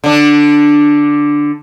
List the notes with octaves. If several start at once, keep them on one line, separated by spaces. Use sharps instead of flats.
D3 D4